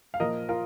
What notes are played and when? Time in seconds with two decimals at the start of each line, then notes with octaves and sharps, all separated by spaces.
0.14 F5
0.20 A#2 F3 A#4 D#5
0.49 F4 A#4